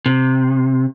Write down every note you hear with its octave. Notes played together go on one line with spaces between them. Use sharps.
C3